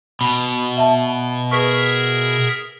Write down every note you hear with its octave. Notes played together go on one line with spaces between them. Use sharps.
B2 B5
E5 A5
G#4 A#4 B4 E5 C#6